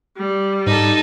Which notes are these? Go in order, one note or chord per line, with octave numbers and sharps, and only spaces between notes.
G3
G#2 D#4 A4